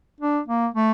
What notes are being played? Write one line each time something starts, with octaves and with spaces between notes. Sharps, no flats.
D4
A#3
A3